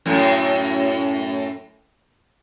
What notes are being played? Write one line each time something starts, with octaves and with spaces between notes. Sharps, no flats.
F#2 A2